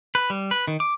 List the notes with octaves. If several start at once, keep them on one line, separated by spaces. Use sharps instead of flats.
B4
G3
B4
D#3
D6